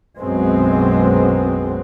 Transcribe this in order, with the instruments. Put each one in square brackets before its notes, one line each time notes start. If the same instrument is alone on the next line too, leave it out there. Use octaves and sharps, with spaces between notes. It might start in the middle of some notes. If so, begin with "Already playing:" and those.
[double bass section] B1 F#2 F#3 G#3 B3 C4